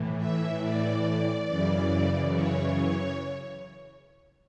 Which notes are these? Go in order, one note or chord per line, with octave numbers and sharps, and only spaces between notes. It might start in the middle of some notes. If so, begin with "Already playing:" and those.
Already playing: A2 E3
E5
D5
F#2 C#3 E3
C#5